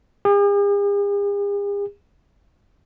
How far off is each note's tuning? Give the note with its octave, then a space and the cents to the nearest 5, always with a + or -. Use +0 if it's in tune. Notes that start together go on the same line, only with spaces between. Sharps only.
G#4 -45